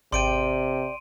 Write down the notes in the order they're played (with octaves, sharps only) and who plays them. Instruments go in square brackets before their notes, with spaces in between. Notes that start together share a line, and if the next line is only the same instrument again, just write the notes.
[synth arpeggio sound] G#1 [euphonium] C3 [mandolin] D5 G5 [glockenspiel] C6 D7 D#7